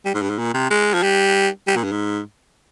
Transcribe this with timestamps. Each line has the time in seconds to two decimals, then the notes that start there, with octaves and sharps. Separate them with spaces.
0.05 G3
0.14 G#2
0.22 G2
0.30 G#2
0.39 A#2
0.54 C3
0.70 G#3
0.94 F3
1.03 G3
1.67 G3
1.76 A#2
1.84 G2
1.92 G#2